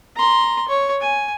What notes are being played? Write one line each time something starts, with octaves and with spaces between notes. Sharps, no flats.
A#5 C6
C#5
G#5